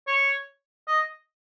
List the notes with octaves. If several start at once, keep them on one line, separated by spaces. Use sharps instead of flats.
C#5
D#5